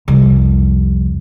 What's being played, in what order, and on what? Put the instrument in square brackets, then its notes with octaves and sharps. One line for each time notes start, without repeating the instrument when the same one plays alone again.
[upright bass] C2 F2